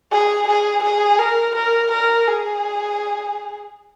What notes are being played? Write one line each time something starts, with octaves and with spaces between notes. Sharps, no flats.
G#4
G#4
G#4
A#4
A#4
A#4
G#4